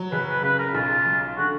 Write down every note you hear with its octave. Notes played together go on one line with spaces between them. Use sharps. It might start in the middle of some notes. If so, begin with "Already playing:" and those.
Already playing: F#3
F#1 B4
B4
C#3 B4
A#4
B1 F4
F#3
D3 F#4